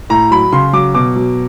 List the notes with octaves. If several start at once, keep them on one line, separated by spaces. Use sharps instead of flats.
A2 A#5
F#3 B5
C#3 C6
F#3 D6
B2 D6
F#3